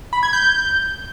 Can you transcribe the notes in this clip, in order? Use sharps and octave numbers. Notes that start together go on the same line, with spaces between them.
B5
G#6
G6